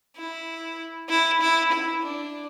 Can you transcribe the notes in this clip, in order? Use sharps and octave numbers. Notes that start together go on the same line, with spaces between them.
E4
E4
E4
E4
D4